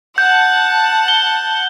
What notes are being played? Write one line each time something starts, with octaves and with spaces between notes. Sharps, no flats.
F#5 A5 G6
G7